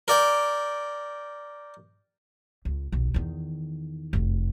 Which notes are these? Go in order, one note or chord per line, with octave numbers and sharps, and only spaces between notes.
A#4 D5 G5
C#2
D#1 B1
E2 D#3
F1 F#2